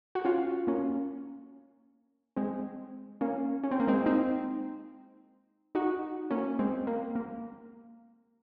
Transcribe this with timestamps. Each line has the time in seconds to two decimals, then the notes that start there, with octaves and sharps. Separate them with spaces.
0.15 F#4
0.25 C#4 F4
0.67 A#3 C#4
2.36 G#3 C4
3.21 A#3 C#4
3.64 C#4
3.71 C4
3.80 A#3
3.87 G#3 C4
4.06 C4 D#4
5.75 D#4 F#4
6.31 A#3 C#4
6.59 G#3 C4
6.87 A#3
7.15 A#3